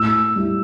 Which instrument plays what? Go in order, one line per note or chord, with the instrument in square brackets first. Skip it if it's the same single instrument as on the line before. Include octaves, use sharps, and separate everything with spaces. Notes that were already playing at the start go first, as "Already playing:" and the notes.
Already playing: [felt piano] A2 [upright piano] E6
[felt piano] G3 E4